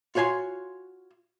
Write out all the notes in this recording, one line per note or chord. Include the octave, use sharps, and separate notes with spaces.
F4 F#4 C#5 G#5 C6